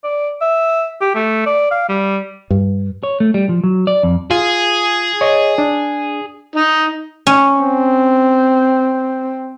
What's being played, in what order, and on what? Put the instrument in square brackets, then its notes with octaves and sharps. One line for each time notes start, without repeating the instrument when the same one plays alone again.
[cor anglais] D5
E5
G4
A3
D5
F5
G3
[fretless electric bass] G2
[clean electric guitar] C#5
A3
G3
F3
F#3
D5
F2
[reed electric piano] F4 [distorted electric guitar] G#4
[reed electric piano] C#5 D#5
D4
[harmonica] D#4
[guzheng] C#4
[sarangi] C4